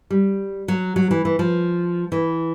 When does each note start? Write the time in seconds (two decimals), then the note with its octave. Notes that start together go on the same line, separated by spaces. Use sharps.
0.10 G3
0.68 F#3
0.96 F#3
1.11 E3
1.25 E3
1.39 F3
2.12 E3